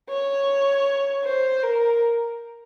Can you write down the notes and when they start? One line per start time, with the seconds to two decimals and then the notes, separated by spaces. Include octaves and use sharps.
0.09 C#5
1.24 C5
1.62 A#4